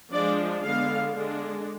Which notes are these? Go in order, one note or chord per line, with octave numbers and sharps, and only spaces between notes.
F3 G#3 D4 D5
D3 G#3 B3 D4 F5
D3 G#3 D4